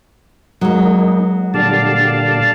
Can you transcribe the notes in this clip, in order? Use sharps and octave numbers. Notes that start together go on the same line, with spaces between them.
F#3 G#3 A#3 D#4
A#2 D3 G3 D5 F5 A5